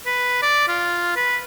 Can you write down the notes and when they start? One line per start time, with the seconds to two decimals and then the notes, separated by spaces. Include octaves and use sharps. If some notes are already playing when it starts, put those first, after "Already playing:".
0.06 B4
0.42 D5
0.68 F4
1.16 B4